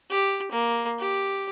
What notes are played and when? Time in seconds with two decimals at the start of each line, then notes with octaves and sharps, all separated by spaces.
0.10 G4
0.51 A#3
0.99 G4